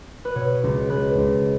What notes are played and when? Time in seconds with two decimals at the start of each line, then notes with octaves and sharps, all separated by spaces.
0.25 B4
0.35 B2 C#5
0.63 C#2
0.90 G#3 B4
1.18 C#2